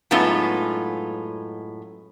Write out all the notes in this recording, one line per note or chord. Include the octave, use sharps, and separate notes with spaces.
F#2 A2 G#3 B3 D#4 F4